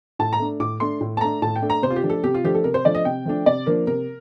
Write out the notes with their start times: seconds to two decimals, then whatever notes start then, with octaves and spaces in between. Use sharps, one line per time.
0.19 A2 A5
0.33 A#5
0.40 A3 D4
0.60 A2 D6
0.80 A3 D4 C6
1.01 A2
1.17 A5
1.21 A3 D4 A#5
1.42 A2 A5
1.56 G5
1.62 A3 D4
1.70 A#5
1.83 C3 C5
1.90 F4
1.96 G4
2.03 F3 A3 D4
2.10 A4
2.24 C3 G4
2.34 F4
2.44 F3 A3 D4 G4
2.55 A4
2.64 C3 A#4
2.74 C5
2.85 F3 A3 D4 D5
2.95 D#5
3.05 C3 G5
3.26 F3 A3 D4
3.46 C3 D5
3.66 F3 A#3 D4 A#4
3.87 C3 A#4